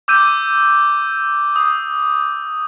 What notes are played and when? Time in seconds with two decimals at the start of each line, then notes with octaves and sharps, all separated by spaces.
0.08 D6 E6 G6 D#7
1.56 D#6